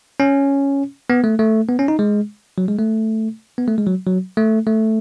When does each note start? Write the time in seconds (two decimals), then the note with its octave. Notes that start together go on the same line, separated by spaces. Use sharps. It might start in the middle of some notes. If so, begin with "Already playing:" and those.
0.20 C#4
1.10 B3
1.24 A3
1.39 A3
1.69 B3
1.79 C#4
1.88 D#4
1.99 G#3
2.58 F#3
2.68 G#3
2.79 A3
3.58 B3
3.68 A3
3.78 G#3
3.87 F#3
4.07 F#3
4.37 A3
4.67 A3